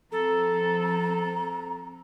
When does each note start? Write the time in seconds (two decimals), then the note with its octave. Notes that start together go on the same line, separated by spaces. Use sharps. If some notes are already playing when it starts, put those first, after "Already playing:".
0.12 F3 C4 A4 A#5